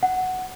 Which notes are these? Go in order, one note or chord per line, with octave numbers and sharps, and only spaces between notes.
F#5